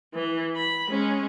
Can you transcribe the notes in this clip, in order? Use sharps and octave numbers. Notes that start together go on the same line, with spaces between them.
E3
B5
G#3 C#4